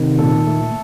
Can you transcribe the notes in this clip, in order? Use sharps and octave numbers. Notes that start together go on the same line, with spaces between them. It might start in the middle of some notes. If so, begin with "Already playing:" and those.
Already playing: C3 D#3
A#2 A4
A3